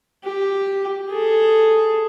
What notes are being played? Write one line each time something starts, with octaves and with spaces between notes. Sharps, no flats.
G4
G#4 A4